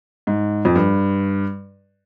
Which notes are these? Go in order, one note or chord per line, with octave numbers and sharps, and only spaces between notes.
G#2
F2
G2